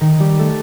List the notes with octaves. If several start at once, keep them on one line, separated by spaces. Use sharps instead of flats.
D#3 D#4
G3 G4
A3 A4